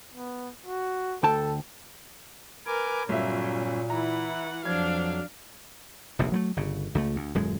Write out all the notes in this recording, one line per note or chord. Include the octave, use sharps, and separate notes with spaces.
B3
F#4
D2 A4 G5 A5
A#4 B4 G#5 D6
G1 A#2 F#3 C#4 E5
E3 E4 F#5 A#5
F2 F3 F#3 D4 F5 G#6
F1 A#1 C3
F#3 G3 A3
G1 C#3
C#2 F#3 A3
D2
D#1 F#2 G#3